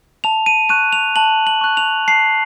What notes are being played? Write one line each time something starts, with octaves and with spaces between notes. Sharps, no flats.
A5 F7
D#7
C#6 F#6 D#7
F7
A5 F#7
F#7
C#6 F#6
F7
A5 C7